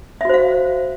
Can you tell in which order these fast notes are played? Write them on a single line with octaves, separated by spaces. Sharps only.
E5 F#4 C5 F5